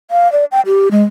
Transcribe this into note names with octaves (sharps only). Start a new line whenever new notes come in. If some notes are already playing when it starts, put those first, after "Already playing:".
F5
D5
G5
G4
G#3